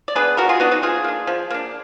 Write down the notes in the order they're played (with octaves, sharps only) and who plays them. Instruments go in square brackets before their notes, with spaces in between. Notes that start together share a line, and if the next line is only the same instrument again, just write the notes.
[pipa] D5
B3 D4 G#4 B4
F3 F#4 A#4
F4 G#4
B3 D4 D#4 F#4
D#4 F#4
F3 F4 G#4
A#3 D4
F3
A#3 D4